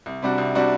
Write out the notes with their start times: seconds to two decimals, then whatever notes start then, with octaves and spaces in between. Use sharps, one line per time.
0.06 C2
0.22 C3 G3 D4 F#4
0.38 C2
0.55 C3 G3 D4 F#4